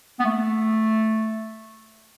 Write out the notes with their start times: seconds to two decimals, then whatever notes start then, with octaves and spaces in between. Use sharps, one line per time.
0.20 B3
0.25 A3